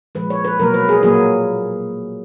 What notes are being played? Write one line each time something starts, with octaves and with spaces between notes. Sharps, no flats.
A#2 F3 G#3 B4
C#5
B4
B2 F#3 A#3 A#4
B4
G#4
A#2 F#3 A#3 G#4